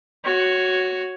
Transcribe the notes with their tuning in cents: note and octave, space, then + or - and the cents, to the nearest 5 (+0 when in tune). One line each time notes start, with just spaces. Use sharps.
F#4 +0 C#5 +0